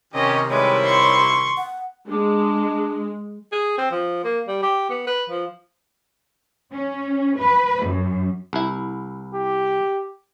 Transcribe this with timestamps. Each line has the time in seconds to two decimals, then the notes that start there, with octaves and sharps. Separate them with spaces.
0.14 C3 D#3 C#4 G4 D#5
0.50 G3 G#3 E4 B4 C#5
0.84 C6 C#6
1.57 F#5
2.08 G#3 D4
3.52 G#4
3.78 C4
3.91 F3
4.24 A#3
4.48 G3
4.63 G4
4.90 B3
5.07 B4
5.30 F3
6.72 C#4
7.39 B4
7.85 F#2
8.53 C2 E4
9.34 G4